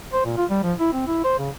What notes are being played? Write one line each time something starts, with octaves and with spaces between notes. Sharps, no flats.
C5
A#2
F4
G3
F3
E4
C4
E4
C5
C#3